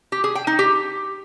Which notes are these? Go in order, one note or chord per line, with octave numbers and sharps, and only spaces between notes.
G4
G#4
G5
D#4
G4